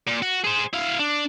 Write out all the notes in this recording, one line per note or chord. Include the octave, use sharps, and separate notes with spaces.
A#2
F#4
G#4 C5
E4 F5
D4